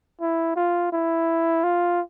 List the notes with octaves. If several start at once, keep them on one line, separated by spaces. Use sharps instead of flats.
E4
F4
E4
F4